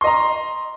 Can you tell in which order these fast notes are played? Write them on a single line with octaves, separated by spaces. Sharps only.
C6 D#5 A#5